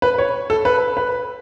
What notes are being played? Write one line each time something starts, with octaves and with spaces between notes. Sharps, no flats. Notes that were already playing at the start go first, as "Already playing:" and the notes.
B4
C#5
A4
B4
B4